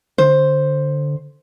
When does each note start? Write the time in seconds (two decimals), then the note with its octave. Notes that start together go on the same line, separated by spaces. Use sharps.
0.18 D3 C5